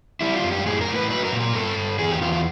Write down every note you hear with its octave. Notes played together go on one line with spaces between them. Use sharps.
G3 E4
F4
F#2
G4
A2 G#4
A#4
A2
B4
F#3 B4
A#4
A#2
A#4
G2 A4
G2
E2 G#4
G4
E2 F4
F4